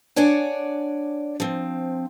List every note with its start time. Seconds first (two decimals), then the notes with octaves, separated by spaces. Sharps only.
0.16 D4 C#5 D5 F#5 G#5
1.40 F3 C4